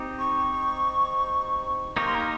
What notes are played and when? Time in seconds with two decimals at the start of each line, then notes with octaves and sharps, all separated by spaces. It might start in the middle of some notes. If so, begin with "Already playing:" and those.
Already playing: C4 D#4 G4
0.19 C#6
1.96 A#3 D#4 G4 A#4 C#6
2.06 C6
2.15 A#5